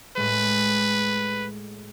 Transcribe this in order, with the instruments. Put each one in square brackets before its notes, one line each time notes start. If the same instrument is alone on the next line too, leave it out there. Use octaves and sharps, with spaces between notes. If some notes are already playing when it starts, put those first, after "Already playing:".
[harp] A2 G#3 [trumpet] B4